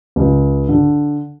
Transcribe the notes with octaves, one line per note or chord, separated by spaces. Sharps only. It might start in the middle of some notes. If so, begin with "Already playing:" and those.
C#2
D3